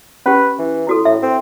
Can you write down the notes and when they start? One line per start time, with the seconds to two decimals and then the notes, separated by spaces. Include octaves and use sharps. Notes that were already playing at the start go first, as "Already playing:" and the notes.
0.26 C#4 G4 B4
0.59 E3
0.87 E4 F#4 A4
1.05 A2 E5
1.22 C4